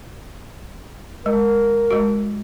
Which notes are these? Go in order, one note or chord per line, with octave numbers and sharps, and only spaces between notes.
G#3 A#4
G#3 F#4